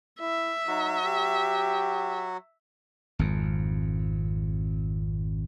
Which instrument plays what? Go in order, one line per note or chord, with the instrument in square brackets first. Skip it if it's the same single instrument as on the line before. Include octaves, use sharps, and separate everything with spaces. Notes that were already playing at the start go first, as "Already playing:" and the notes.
[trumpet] E4 [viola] E5
[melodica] F#3 F#4 [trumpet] D#4
[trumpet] G4
[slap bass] G#1 F2